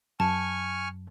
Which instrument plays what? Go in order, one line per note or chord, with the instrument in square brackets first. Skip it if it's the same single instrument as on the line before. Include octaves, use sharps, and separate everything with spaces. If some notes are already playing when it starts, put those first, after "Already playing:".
[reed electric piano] F#2 [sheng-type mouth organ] G#5 C#6 F6 [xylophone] A5